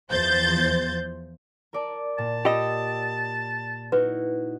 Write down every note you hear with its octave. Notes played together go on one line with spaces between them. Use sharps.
E2 F3 C5 G6 A6
A#4 D5 A5
A#2 A5
F4 G4 D#5 G5 E6
D#4 E4 F#4 B4